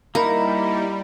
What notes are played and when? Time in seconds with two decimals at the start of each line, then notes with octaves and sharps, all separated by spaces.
0.15 G3 A#3 D#4 E4 A#4 B5